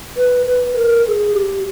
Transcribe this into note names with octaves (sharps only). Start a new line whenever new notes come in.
B4
B4
A#4
A#4
G#4
G4